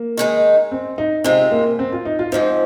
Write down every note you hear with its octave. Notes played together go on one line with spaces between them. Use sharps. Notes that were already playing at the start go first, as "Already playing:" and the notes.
Already playing: A#3
D#3 G#3 D#4
C4
D#4
C3 G#3 C4 F4
A#3
C4
F4
D#4
F4
G#2 F3 C4 D#4